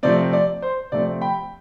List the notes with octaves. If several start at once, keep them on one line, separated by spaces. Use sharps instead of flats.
C3 F3 A3 C4 D5
D5
C5
C3 F3 A3 C4 D5
G5 B5